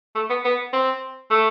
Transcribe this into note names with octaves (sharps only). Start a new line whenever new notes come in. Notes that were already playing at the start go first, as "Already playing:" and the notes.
A3
B3
B3
C4
A3